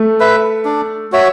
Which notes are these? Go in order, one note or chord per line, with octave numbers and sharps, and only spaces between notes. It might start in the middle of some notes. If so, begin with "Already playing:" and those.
Already playing: A3
B4 E5
D4
F#4 C#5 E5